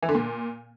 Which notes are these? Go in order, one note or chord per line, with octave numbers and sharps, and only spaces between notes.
E3
D3
A#2